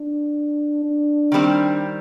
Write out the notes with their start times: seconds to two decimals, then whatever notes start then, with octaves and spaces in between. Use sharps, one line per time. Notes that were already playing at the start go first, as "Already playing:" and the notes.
Already playing: D4
0.84 D4
1.32 D#3 G3 C4